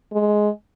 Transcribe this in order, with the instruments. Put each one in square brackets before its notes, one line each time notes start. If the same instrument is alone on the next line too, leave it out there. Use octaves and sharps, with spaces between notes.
[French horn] G#3